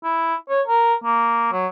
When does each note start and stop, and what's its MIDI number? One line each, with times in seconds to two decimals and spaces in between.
0.03 0.35 64
0.50 0.62 73
0.68 0.95 70
1.04 1.51 58
1.52 1.67 54